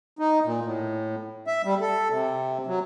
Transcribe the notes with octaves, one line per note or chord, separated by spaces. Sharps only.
D#4
A#2
A2
E5
G3
A4
C3
F#3